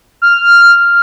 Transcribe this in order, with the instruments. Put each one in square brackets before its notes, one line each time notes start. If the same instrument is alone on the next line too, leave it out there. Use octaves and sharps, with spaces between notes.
[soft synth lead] F6